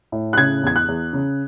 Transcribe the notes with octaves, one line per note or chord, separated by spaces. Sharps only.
A2
F#6
C#3 G#6
E2 G#6
F#6
E2
C#3